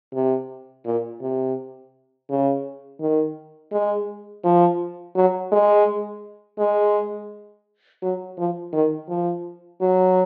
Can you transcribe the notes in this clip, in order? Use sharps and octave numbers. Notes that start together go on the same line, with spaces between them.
C3
A#2
C3
C#3
D#3
G#3
F3
F#3
G#3
G#3
F#3
F3
D#3
F3
F#3